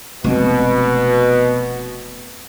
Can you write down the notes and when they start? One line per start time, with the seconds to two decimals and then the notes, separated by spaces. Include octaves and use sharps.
0.24 F1 B2 G#3 C4